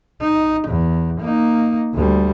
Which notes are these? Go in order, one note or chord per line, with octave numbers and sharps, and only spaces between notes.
D#4
E2
A#3 D#4
D2 G3